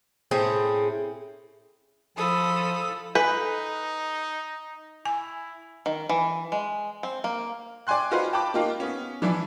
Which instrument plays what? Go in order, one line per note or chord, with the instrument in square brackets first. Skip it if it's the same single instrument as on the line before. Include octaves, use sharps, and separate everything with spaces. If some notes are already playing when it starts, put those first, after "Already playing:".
[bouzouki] A2 C4 C#4 G#4
[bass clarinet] F3 [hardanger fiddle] F4 B5 [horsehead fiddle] A4 [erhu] D#6
[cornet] D#4 [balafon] A4 G#5 [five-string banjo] B4
[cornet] E4 [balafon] G#5
[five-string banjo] D#3
E3
G#3
C4
A#3
[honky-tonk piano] D5 G5 G#5 C6 F#6
D#4 F4 F#4 B4 C5
G5 A5 B5 D6
A#3 D#4 F4 G4
B3 C#4
E3 F3 D4 E4